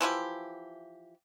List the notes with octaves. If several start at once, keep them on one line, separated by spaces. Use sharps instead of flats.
E3 F3 E4 G4